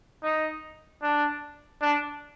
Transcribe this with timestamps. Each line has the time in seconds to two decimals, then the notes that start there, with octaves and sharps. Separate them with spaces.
0.23 D#4
1.02 D4
1.82 D4